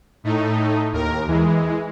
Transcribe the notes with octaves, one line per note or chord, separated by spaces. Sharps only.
A2 A3 D#4
D#2 A#4
E3 G#3